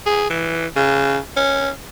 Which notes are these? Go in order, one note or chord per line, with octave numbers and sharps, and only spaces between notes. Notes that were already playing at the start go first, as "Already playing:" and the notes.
G#4
E3
C#3
C#4